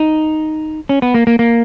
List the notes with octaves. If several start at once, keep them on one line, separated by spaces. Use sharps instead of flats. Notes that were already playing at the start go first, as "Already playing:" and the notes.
Already playing: D#4
C#4
B3
A#3
A#3
A#3